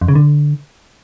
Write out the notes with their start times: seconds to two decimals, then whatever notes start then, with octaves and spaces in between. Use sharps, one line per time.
0.01 F2
0.08 C#3
0.15 D3